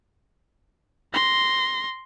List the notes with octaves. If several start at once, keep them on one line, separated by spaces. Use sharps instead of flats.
C6 A#6